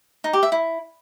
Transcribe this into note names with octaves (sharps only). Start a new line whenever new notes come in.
D#4
G4
E5
E4